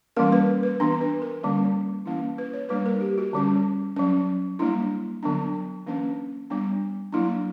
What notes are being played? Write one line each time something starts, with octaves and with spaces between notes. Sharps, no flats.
E3 G3 A#3 C#4 A#4
B4
B4
E3 B3 D4
B4
A#4
D3 G3 A#3 C#4
E3 A#3 C#4 E4
B4
C#5
G3 A#3 D4 B4
A#4
G4
F#4
D3 G3 C#4
F#3 C#4
G3 A#3 D4 E4
D3 F#3 B3 D4
E3 A#3 C#4 D4
G3 B3 D4
F#3 A#3 D4 E4